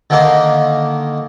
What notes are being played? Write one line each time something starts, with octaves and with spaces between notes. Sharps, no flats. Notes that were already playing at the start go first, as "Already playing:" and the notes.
D3 D#3 A#3